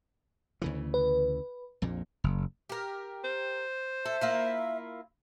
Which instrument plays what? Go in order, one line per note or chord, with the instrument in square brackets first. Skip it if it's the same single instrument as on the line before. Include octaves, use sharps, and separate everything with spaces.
[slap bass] D2 C#3 E3
[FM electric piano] B4
[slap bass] A#1 F2 A#2
F#1
[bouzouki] G4 A#4
[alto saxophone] C5
[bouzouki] A4 [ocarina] E5
[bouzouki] A#3 E4 F4